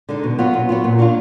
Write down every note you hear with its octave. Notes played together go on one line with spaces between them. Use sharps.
D3 G#3 D#4
B2
F#3 B3 F4
B2
F#3 B3 F4
A#2
F#3 D4 F4